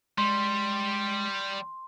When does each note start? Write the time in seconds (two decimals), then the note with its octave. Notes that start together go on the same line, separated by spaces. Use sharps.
0.18 G3 G#3 C6